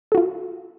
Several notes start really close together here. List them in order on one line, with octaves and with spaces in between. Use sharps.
A4 F#4 F4